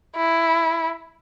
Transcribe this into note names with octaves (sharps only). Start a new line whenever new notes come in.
E4